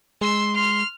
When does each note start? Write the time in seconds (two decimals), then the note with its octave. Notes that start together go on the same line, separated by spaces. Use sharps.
0.21 G#3 C6 E6
0.55 C6 F6